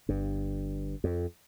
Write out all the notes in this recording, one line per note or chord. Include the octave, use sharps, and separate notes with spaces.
G1 G2
F2